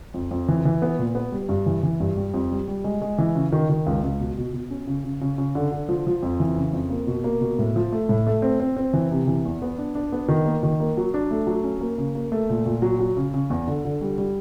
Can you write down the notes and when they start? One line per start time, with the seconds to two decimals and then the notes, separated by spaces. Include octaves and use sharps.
0.14 F2
0.31 F2
0.48 E3
0.65 E3
0.82 B3
0.99 A#2
1.15 B3
1.32 G3
1.49 G2
1.66 E3
1.83 E3
2.00 G2
2.17 G3
2.34 F2
2.51 G3
2.68 G3
2.84 G#3
3.02 G#3
3.18 E3
3.35 C#3
3.52 D#3
3.69 D#3
3.86 C#2
4.03 C#2
4.20 B2
4.37 B2
4.53 B2
4.70 C#4
4.87 C#3
5.04 C#3
5.21 C#3
5.38 C#3
5.55 D3
5.72 D3
5.89 F3
6.07 F3
6.23 F2
6.40 E3
6.56 C#3
6.73 F2
6.90 A#3
7.07 B2
7.24 A#3
7.41 B2
7.59 A2
7.76 F3
7.92 A3
8.09 A2
8.27 A3
8.42 C4
8.60 C4
8.76 C4
8.93 E3
9.11 C3
9.27 E3
9.45 E2
9.62 B3
9.78 D4
9.95 D4
10.12 B3
10.28 D#3
10.45 A#3
10.63 D#3
10.80 A#3
10.97 F#3
11.14 D4
11.31 A3
11.47 F#3
11.64 C#4
11.81 A#3
11.98 C#3
12.15 A#3
12.32 A3
12.49 A#2
12.66 A#2
12.82 F#3
12.99 F#3
13.17 C#3
13.34 C#3
13.50 E2
13.67 D3
13.85 D3
14.01 G3
14.18 G3